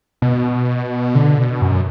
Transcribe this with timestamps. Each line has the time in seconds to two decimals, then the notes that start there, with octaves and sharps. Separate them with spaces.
0.22 B2
1.15 D3
1.38 B2
1.62 F#2